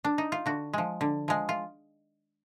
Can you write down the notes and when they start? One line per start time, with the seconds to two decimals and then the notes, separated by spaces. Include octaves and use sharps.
0.04 D4
0.18 D#4
0.32 F4
0.46 D3 F#4
0.73 F3 G#3
1.01 D3
1.28 F3 G#3
1.49 F4